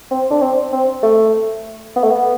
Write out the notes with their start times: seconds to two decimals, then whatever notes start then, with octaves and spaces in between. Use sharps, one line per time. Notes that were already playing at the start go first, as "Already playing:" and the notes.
0.11 C4
0.31 D4
0.42 C4
0.72 C4
1.03 A3
1.96 B3
2.04 A3
2.11 B3